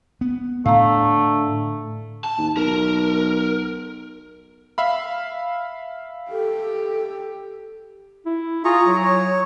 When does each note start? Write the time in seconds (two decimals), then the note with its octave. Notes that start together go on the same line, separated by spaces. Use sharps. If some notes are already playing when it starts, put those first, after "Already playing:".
0.21 B3
0.66 A2 D3 A3 F5 A#5
2.24 A5
2.38 D#2
2.57 B1 A#4
4.78 E5 F5 B5
6.31 G4 A4
8.26 E4
8.65 F4 G#4 A#5 C#6
8.87 F#3
9.03 C#5